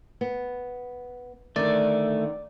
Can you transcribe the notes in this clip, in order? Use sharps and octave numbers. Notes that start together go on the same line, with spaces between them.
B3
D3 D#3 A3 D5